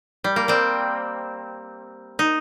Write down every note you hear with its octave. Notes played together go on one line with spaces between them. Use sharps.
G3
A#3
G3 C4
D#4